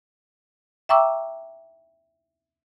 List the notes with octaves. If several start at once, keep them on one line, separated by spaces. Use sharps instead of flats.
E5 G5 A#5 C#6 D6 E6